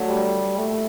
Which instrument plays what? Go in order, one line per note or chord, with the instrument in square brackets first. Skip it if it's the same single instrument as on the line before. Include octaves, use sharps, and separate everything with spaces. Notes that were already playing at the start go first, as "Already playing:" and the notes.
Already playing: [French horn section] D3 F#3 A3
[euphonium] G3
[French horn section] A#2 [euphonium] A3